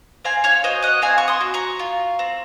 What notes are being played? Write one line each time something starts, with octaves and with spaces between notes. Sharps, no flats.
C4 F5 G#5
C#5 F5
F#4 C5 D#5
D#5 F#5
C4 F5 G#5
C#6
C6 D#6
F#4
A#5 C#6
F4
C4